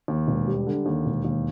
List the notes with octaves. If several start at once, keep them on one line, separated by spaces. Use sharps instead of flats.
D#2
E1
G3
D3
D#2
E1
D#2